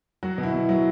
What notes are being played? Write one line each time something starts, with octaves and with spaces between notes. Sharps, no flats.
F#3 F#4
B2
E4
B2
F#3